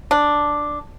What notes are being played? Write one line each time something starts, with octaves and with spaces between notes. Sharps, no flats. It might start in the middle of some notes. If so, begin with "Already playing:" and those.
D4